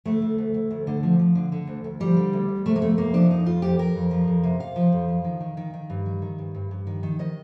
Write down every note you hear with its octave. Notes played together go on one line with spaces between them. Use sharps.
D2 A3
D2
D2
D2
D2
D3
F3
F3
D3
D3
D2
D2
F3 G3
D3
D2
D2
C3 A3
A#3
F2 A3
C3 A#3
F3 D4
F2 D#4
F2 F4
F2 G4
F2 A#4
F2
F3
F2
C3
C3 F5
F3
F2
F3
D#3
D#3
D#3
D#3
G2
D#3
D#3
G2
G2
G2
D#3
D#3
D#3 D#5